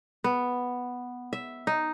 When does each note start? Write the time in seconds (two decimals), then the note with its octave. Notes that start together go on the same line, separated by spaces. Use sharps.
0.24 B3
1.33 E5
1.67 D#4